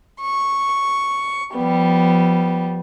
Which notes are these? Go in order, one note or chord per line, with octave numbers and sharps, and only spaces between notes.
C#6
F3 G3 B3